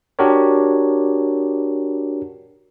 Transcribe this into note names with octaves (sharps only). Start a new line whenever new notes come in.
D4 F#4 G4 A#4 C#5